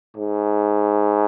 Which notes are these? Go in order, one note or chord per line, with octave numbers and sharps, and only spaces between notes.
G#2